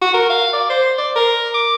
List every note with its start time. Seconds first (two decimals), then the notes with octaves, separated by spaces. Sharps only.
0.02 F#4
0.14 A#4
0.29 F5
0.53 D5
0.70 C5
0.98 D5
1.15 A#4
1.54 D6